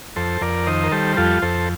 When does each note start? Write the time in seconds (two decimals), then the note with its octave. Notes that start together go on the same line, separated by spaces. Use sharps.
0.16 F2 A4 C5
0.41 F2 A#4 D5
0.67 D#3 C5 D#5
0.84 A#4
0.92 G3 A4 C5
1.17 F2 F4 A4
1.42 F2 A4 C5